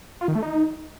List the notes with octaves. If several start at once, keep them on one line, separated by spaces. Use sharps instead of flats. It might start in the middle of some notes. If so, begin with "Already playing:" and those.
F4
D#3
A3
D#4